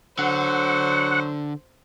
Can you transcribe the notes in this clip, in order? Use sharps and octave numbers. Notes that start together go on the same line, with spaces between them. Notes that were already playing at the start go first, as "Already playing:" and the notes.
D3 F#3 C5 F#5